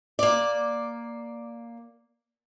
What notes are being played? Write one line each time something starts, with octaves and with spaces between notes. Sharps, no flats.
A#3 D5